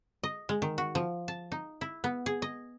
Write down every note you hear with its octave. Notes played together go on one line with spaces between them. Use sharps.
D#5
G#3
D#3
F#4
F3
A5
D#4
E4
B3
G#4
D#5